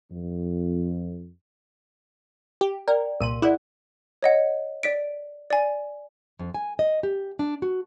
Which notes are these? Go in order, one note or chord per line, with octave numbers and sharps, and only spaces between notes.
F2
G4
A#4 D5 G5
C2 A#2 A#4 F5 C6 D#7
E4 G#4 A#4 D5 F#5
C#5 D#5 F#5
D5 B6 D7
D5 G#5
F2
G#5
D#5
G4
D4
F#4